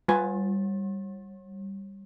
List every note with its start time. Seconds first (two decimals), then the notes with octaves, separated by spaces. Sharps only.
0.08 G3 F4 B4 G#5